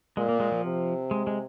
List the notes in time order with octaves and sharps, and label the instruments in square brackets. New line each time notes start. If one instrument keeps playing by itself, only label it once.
[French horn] A#2 [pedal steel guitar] G#3
[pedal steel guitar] A#3
G#3
F3
[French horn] C3
[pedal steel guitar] G#3
G#3